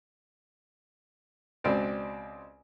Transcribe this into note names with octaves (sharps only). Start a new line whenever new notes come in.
C#2 B2 C4 D5